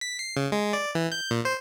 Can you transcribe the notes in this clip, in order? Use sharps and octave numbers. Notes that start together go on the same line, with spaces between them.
B6
C7
C#3
G#3
D5
E3
G6
A#2
C5